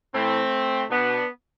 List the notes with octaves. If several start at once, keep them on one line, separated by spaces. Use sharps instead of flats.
A2 E3 A3 C4
B2 B3 D4